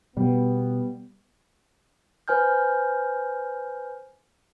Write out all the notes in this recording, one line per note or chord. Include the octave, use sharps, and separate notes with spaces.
B2 G3 B3
B4 C5 G#5 F6 G6